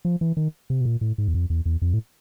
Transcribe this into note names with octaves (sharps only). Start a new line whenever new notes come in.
F3
E3
D#3
C3
B2
A#2
A2
G#2
E2
F2
E2
E2
F2
A2